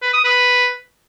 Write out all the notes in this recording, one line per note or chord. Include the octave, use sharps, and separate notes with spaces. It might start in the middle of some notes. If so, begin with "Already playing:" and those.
B4
D#6
B4